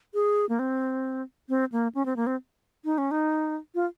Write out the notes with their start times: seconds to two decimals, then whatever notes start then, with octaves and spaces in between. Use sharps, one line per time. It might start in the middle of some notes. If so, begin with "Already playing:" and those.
0.14 G#4
0.49 A#3
0.59 C4
1.49 C4
1.72 A#3
1.95 C#4
2.06 C4
2.16 A#3
2.27 C4
2.85 D#4
2.98 C#4
3.11 D#4
3.75 F4